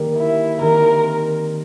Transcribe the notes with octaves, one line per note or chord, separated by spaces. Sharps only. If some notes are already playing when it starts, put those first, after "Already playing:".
Already playing: D#3 G3 A#3
E4
D#3 G3 C4 A#4